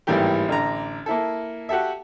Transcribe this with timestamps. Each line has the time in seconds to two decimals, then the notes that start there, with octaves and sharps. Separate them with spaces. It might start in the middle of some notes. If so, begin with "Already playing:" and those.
0.07 G#1 A2 E3 G3 A#3 G4
0.48 A1 D3 A#5
1.06 A#3 E4 A4
1.69 F#4 G4 A4 E5